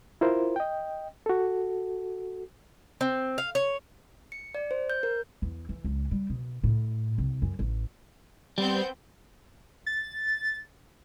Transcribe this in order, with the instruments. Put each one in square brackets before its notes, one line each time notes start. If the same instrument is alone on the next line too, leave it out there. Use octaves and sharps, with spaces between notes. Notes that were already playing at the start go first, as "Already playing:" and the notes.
[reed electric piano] E4 F4 A#4 C5
D#5 G5
F#4 A4
[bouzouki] C4
F5
C#5
[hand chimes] C#7
D5
C5
G6
A#4
[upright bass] E2
E3
C#2
G3
B2
A2
C2
F#2
A1
[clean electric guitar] G3 [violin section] B3 C4 G6
[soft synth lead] A6